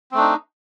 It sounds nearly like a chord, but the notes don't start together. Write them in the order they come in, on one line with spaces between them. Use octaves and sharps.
C4 A3 D4 D#4